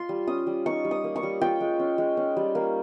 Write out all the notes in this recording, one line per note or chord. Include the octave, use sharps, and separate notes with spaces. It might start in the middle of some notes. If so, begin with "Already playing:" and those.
Already playing: F4 C6
G3
C#4 D#6
G3
D#4 C#6
G3
D#6
A#3
C#6
G3
F4 G5
G#3
C#4
G#3
C#4
G3
A#3